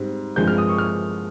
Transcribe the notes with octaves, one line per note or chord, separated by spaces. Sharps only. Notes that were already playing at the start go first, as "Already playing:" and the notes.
Already playing: G#2 G3 C4
G2 F3 G#3 C4 G6
F6
D#6
C#6
F6